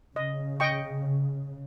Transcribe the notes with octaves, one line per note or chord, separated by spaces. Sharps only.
C#3 D#5
D#5 G5 C#6